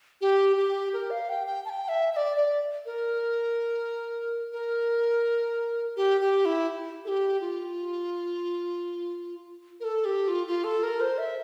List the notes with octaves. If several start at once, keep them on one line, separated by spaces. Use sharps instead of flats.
G4
G4
A#4
F5
G5
G5
A5
G5
E5
E5
D5
D5
A#4
A#4
G4
G4
E4
A4
G4
F4
A#4
A4
G4
F4
F4
A4
A#4
C5
E5